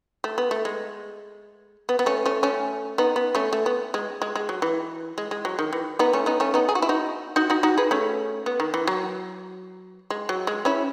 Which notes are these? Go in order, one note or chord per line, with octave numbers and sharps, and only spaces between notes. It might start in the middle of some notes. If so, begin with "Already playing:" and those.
A3
B3
A3
G#3
B3
B3
A3 C#4
A3 C#4
A3 C#4
B3 D#4
B3
A3 C#4
A3
B3
G#3
G#3
G#3
F#3
E3
G#3
G#3
F#3
D#3
E3
B3 D#4
A3 C#4
B3 D#4
A3 C#4
B3 D#4
G#4
F#4
E4
D#4 F#4
D#4 F#4
D#4 F#4
D#4 F#4
G#4 B4
A3 C#4
B3
D#3
E3
F#3
G#3
F#3
G#3
C#4 E4